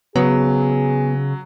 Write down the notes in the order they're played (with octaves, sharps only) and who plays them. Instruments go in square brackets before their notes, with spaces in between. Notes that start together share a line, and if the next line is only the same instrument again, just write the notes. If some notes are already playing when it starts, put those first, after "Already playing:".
[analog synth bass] C#3 [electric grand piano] F#3 [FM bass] B3 [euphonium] G#4